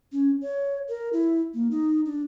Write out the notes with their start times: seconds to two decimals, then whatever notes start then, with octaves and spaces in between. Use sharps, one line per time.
0.12 C#4
0.43 C#5
0.89 A#4
1.13 E4
1.54 A#3
1.71 D#4
2.06 D4